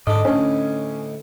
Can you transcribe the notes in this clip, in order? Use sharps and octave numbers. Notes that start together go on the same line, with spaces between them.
G#2 D3 D4 D#5
D2 A2 C#4 D4